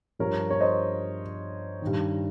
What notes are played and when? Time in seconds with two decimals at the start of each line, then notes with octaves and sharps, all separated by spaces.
0.19 G2 F3 A#4 C#5
0.50 C#5
0.60 C5 D#5
1.82 G2 D#3